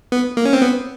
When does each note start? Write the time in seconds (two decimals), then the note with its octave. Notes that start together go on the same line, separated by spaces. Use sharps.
0.12 B3
0.37 A#3
0.45 C#4
0.53 C4
0.62 B3